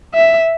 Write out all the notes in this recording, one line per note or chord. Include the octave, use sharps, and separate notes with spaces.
E5